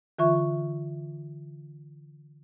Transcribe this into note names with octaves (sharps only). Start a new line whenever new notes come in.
D3 E3 F4 E5 C#6